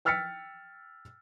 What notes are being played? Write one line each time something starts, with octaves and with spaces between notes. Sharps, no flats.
G5 E6 F6 A6 B6 C#7